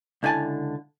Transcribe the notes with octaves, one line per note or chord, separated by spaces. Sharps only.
C#2 D3 E4 G#5 A5